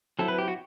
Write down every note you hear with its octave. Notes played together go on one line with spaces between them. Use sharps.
F#3 C4 E4 A4
B4
G4
F#4